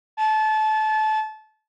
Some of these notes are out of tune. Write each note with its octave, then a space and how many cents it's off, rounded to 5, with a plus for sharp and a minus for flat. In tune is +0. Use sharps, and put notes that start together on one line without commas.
A5 -25